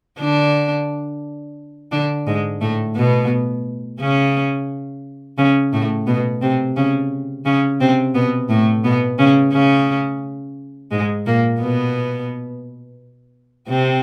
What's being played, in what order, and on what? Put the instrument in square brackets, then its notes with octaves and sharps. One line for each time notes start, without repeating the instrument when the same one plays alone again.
[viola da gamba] D3 D4
D3 D4
G#2 G#3
A2 A3
B2 B3
C#3 C#4
C#3 C#4
A2 A3
B2 B3
C3 C4
C#3 C#4
C#3 C#4
C3 C4
B2 B3
A2 A3
B2 B3
C#3 C#4
C#3 C#4
G#2 G#3
A#2 A#3
B2 B3
C3 C4